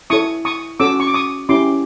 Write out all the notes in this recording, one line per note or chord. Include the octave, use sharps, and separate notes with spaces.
E4 A4 C#5 C#6 D#6
C#6 D#6
C#4 F#4 A4 C#5 D6 E6
C#6
D6
C#6 D#6
C#4 E4 G4 C6 D6